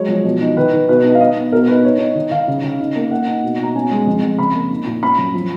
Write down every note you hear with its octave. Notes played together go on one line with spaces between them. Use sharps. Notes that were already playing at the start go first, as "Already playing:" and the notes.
Already playing: F#3 G#3 C#5
F3
B2
D#4
D#3 B4
D#3
B2 B4
D#4
F5
D#4 D#5
B3
B2 A#4
D#4 B4
D#4 C#5
D#4
D#3
D#3 F5
C#3
C#3
D#4
A#3
A#3 F#5
D#4
B2
B2 A#5
C#4 G#5
G#3
F2
F2
C#3 B5
A#3
D#4
A#2
C#4 B5
F#2
F3